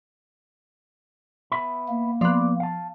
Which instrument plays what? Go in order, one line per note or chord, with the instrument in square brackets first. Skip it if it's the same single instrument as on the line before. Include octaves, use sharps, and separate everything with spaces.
[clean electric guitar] B3 E5 B5
[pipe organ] A#3
[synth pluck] F3 B3 [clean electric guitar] D5
[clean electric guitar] F5 A5